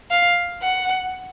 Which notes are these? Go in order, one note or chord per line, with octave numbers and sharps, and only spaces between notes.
F5
F#5